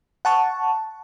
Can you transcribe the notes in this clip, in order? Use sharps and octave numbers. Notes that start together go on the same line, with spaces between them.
F#5 A5 C#6